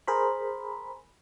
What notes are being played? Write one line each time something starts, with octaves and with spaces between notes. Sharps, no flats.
G#4 A#4 C5 B5